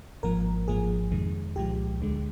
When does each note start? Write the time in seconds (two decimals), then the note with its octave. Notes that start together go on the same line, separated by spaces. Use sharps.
0.23 G#1 G#2 F3 A#3 A#4
0.67 G#1 G#2 F3 A#3 G#4
1.12 F2 C3 D#3 G#3
1.56 C2 A#2 F3 G#3 G4
2.00 D2 D3 G#3